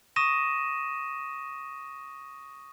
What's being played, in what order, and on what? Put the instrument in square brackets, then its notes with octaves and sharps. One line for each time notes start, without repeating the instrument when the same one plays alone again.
[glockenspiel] C#6 D#6 A#6 D#7 E7